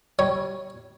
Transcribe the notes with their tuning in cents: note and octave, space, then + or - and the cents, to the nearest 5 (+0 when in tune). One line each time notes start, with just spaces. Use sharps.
G3 -20 C#5 +0